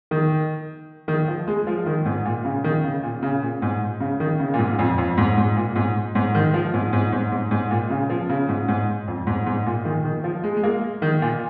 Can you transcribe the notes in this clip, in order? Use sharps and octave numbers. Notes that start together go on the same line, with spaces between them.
D#3
D#3
F3
G#3
F3
D#3
G#2
A#2
C#3
D#3
C#3
A#2
C#3
A#2
G#2
C#3
D#3
C#3
A#2
G#2
F2
F2
G#2
G#2
A#2
G#2
G#2
D#3
F3
G#2
G#2
G#2
G#2
G#2
A#2
C#3
F3
C#3
G#2
G#2
F2
G#2
G#2
A#2
D#3
D#3
F3
G#3
G#3
A#3
D#3
A#2